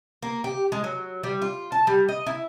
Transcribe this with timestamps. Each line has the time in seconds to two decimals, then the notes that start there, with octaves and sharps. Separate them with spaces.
0.22 A#3
0.44 G4
0.72 G#3
0.84 F#3
1.23 G3
1.42 F4
1.72 A5
1.87 G3
2.09 D#5
2.26 E4